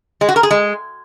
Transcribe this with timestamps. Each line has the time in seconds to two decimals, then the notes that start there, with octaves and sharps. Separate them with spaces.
0.21 G#3
0.28 F#4
0.36 A#4
0.43 G#4
0.51 G#3